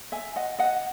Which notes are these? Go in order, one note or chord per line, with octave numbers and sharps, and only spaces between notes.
E5 G#5
D#5 F#5
D#5 F#5